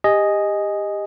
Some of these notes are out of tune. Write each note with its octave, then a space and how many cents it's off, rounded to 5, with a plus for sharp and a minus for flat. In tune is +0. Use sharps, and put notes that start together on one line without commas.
G4 +25 D#5 +0 G#5 +0